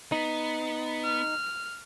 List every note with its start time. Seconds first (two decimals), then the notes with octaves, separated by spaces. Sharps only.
0.12 B3 D#4
1.04 F6